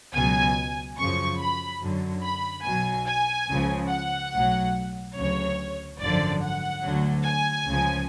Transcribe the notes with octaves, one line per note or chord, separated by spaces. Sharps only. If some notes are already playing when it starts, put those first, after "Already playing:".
C#2 B2 F#3 G#5
F#2 C#3 F3 C#6
B5
F#2 D3 F#3
B5
B1 B2 F#3 G#5
G#5
C#2 C#3 F3
F#5
B1 A2 F#3
D2 C#3 F#3 C#5
G#1 F#2 D3 F3 D5
F#5
D2 D3 F#3
G#5
C#2 C#3 F3